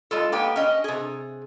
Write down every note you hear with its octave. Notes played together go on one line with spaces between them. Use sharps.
G#3 F4 A4
A#3 B3 G4 G5
C#4 D#5
C3 G#4